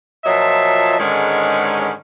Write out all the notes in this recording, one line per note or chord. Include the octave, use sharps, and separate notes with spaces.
A#2 F3 F#3 D#5 E5 A5
G#2 D3 D#3 G#3 C#4